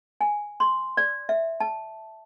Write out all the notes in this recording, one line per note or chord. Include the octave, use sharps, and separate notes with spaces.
G#5
C6
D5
E5
A5